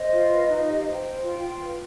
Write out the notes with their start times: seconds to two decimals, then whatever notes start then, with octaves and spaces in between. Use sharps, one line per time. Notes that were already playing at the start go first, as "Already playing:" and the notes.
Already playing: C5 D#5
0.12 F4
0.31 B4
0.49 D#4
0.67 G4 D#5
0.80 F5
0.86 C5
0.92 G5
1.04 C5
1.23 F4
1.41 F4
1.60 B4